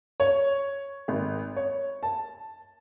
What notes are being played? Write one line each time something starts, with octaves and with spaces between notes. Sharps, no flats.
C#5
G#1
C#5
A5